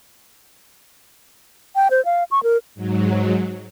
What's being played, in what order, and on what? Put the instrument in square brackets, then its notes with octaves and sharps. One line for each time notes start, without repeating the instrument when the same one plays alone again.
[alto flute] G5
C5
F5
C#6
A#4
[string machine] G#2 F#3